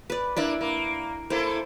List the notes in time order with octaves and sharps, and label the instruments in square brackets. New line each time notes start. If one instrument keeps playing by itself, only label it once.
[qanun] B4 D5
[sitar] A#3 D4 [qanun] E4 D5 B5
[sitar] A#3
[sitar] A#3 E4 A4 [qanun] C5